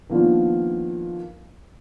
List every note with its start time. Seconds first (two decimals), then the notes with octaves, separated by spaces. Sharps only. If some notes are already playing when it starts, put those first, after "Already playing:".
0.09 D#3 F3 A#3 B3 D4 F4